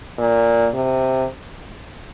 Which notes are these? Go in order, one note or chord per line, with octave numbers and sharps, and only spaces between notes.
A#2
C3